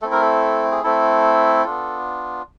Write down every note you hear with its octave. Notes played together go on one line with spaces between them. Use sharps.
A3 C4 E4 A4
A#4
A4
G#4
A3 C4 E4 A4
B3 D4 F4